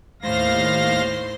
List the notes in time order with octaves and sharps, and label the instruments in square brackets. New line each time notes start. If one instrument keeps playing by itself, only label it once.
[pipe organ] D#2 F5 A#6 [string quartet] A2 C5 C6